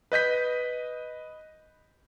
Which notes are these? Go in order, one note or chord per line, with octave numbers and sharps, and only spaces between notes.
B4 D#5 G6 B6